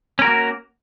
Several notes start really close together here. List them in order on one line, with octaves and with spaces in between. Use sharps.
C#4 A#4 F#4 A#3